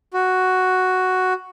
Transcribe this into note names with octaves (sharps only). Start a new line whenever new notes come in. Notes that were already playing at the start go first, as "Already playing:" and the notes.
F#4